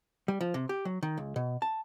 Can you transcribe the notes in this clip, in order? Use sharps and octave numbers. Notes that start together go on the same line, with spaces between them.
G3
F3
C3
G4
F#3
D#3
C#2
B2
A5